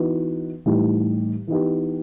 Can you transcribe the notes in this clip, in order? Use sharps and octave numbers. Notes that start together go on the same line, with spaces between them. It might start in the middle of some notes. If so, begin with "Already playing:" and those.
Already playing: E3 B3 D#4 F#4
A2 E3 G3 D#4 G4
E3 B3 D#4 G4